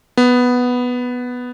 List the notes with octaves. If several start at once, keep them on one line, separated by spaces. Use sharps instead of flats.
B3